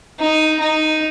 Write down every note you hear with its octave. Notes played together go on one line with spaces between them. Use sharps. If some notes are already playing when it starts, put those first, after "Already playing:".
D#4
D#4